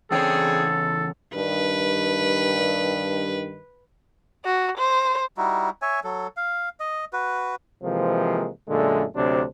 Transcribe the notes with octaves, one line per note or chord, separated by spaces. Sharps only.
E2 C#3 C4 D4 G#4 A4 C#5
G2 D#3 B4
F#4
C5
G3 D#4 E4 F#4
C#5 E5 G#5
F#3 A4
F5
D#5
F#4 B4
C3 E3 F3 G#3 A#3
F#2 A#2 D3 G#3 A3
D2 C3 F#3 D4 C5